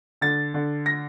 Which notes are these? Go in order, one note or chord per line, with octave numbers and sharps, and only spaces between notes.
D3 A6
D3
A#6